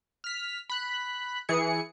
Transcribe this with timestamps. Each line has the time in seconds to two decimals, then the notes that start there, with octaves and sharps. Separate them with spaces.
0.24 F6 B6
0.69 B5 F#6
1.49 E3 G#4 C#7